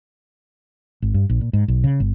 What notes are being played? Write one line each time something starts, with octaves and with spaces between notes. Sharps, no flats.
G#1
G2
A#1
A#2
G#2
B1
C#3
G1